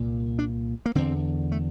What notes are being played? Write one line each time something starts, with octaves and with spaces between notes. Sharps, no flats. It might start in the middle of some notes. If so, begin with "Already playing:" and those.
Already playing: C2 A#2
D4
A#3
E2 D3 C4
A3